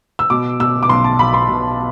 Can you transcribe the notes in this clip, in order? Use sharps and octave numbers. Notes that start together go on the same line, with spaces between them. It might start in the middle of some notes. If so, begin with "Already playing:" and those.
E6
B2 D6
B2 E6
D6
B1 C6
A5
B1 B5
C6
B2